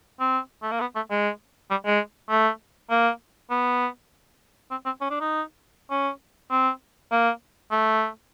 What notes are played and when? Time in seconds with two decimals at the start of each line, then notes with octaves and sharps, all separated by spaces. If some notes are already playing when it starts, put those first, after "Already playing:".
0.20 C4
0.63 A3
0.72 A#3
0.81 B3
0.96 A3
1.11 G#3
1.71 G3
1.86 G#3
2.30 A3
2.91 A#3
3.51 B3
4.71 C4
4.86 C4
5.01 C#4
5.11 D4
5.21 D#4
5.91 C#4
6.51 C4
7.12 A#3
7.71 A3